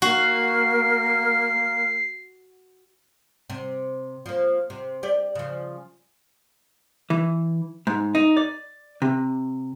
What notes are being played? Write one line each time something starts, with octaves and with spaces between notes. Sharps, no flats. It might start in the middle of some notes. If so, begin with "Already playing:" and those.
A#3 F#4 C7
C3
F3 A#3
C3
G4 D5
C#3 F3
E3
G#2
D#4
D5
C3